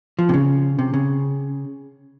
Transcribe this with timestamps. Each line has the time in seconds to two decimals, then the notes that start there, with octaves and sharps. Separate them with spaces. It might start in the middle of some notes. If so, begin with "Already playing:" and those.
0.19 F3
0.29 C3
0.34 C#3
0.79 C3
0.94 C#3